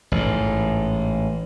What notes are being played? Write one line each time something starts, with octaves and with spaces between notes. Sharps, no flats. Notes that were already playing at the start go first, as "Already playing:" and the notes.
A1 G#2